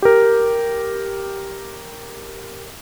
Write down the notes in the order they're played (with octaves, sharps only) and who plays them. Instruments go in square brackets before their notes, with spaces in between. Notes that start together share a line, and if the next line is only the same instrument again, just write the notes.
[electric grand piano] G4 A#4